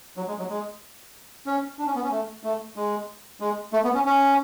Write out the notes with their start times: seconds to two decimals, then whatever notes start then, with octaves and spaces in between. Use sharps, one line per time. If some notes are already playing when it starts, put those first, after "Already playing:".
0.17 F#3
0.28 G#3
0.39 F#3
0.50 G#3
1.46 C#4
1.79 D4
1.86 C#4
1.95 B3
2.03 C#4
2.11 A3
2.43 A3
2.76 G#3
3.40 G#3
3.73 A3
3.84 B3
3.94 C#4
4.05 C#4